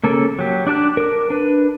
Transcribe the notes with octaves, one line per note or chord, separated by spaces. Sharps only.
C#3 A#3 A4
F#3 G4
D4 D5 A5 F#6
A#4 D6
D4 B4